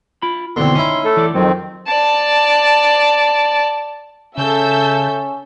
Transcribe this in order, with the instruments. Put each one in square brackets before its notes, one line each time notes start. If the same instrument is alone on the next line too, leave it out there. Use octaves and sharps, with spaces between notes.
[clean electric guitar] F4 B5
[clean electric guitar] D#2 B2 E3 [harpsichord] D3 C4 [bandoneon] C6
[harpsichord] C#4 E4 [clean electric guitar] D#4
[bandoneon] A3 A4
[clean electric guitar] E3 D5
[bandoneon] F2 D#3 C4 [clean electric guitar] F#3
[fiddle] D5 A5
[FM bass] C#3 [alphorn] C#4 [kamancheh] A4 E5 [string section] A5 E6 G6